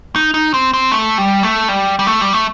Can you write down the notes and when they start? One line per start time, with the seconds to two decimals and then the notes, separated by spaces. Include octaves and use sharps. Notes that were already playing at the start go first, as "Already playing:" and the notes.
0.16 D#4
0.34 D#4
0.54 C4
0.73 C4
0.92 A3
1.18 G3
1.43 A3
1.69 G3
1.99 G3
2.07 A3
2.21 G3
2.33 A3